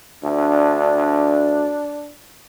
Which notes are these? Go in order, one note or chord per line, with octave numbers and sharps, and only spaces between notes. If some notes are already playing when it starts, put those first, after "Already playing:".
D2 D4